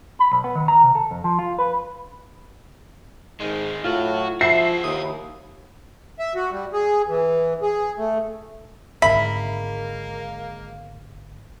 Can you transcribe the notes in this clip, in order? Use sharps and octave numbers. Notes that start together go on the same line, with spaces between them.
B5
B1
B3
D#3
A#5
C3
A4
F2
F3
F4
B4
G#2 D#3 G#3
A2 F#3 F4 F#4
F3 E4 F#4 E5 C7
D#2 D#6
E5
F#4
G3
G#4
E3
G#4
A3
G#1 D3 G#3 A#3 E5 B5